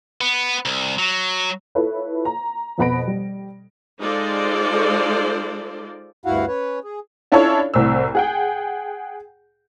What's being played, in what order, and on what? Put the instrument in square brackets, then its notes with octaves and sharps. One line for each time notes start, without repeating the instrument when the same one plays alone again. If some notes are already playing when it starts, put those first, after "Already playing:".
[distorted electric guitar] B3
C2
F#3
[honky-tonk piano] E4 F4 A4 B4 C#5
A#5
F2 B2 B3 B5 A#6 D7
G3
[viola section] G#3 D#4 F4 A4 C5 D5
[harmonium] D2 G2 E4 F#4 F5 F#5
C#4 B4 C#5
G#4
[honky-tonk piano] C#4 D4 E4 F4 A4 C#5
C2 A2 C4 E6
G#4 F#5 G5